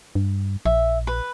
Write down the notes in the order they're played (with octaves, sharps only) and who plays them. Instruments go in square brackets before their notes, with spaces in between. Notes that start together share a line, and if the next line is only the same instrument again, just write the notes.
[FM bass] G2
[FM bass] A#1 [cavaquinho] E5
[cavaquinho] B4